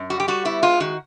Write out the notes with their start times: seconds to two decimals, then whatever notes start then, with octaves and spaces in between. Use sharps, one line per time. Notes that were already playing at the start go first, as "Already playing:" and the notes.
Already playing: F#2
0.10 G3 F#4
0.20 G4
0.28 G3 F#4
0.45 B3 E4
0.62 G#3 F4
0.80 D#3 F#4